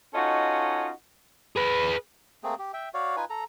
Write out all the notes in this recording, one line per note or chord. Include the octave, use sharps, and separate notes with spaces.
C#4 D#4 F4 F#4 A4 D#5
G#4 B4
A3 A#3 C4 G#4
G4
E5 G5
F#4 C#5 D5 F5
D#4 F4 B4 G#5
A4 A#5